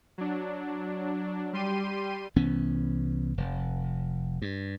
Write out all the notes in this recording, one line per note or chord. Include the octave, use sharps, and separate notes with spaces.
F#3 D4
G3 G4 C6 D#7
C2 E3 B3 C#4
F1
G2